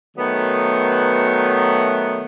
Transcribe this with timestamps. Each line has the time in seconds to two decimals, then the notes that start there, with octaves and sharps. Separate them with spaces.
0.17 D#3 F#3 A3 B3